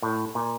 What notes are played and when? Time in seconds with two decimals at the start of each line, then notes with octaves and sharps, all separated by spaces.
0.02 A2
0.35 A#2